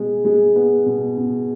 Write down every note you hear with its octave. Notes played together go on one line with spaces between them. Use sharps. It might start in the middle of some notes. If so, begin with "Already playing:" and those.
Already playing: B2 G#3
G#3
B3
B2
B2